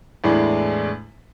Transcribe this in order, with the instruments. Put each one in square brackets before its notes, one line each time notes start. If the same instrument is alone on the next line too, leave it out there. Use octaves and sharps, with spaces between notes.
[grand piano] E2 A2 G#3 D4